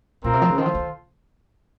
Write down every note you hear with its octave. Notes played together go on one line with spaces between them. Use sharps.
A#2 C4 F4 A#4
C3
F3
C#3
D#3 F4 A4 C5
F3
D#3